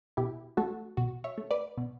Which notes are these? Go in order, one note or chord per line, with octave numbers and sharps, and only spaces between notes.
B2 E4 G4
A3 F#4 A4
B2 F#4
C#5 E5
A3
B4 D5
B2